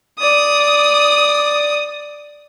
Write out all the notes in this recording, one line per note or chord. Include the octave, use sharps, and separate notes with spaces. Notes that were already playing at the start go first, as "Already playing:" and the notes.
D5 D#6